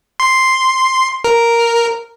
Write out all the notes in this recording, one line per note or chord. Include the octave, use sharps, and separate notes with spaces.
C6
A#4